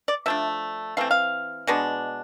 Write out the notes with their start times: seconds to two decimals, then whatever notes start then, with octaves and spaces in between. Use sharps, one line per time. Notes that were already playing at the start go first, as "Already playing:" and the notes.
0.08 D5
0.26 F3 A3 D4 E5
0.97 E3 A3 C4 F5
1.11 F5
1.67 B2 G#3 B3 D4